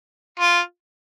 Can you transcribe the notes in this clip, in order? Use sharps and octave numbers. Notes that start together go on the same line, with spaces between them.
F4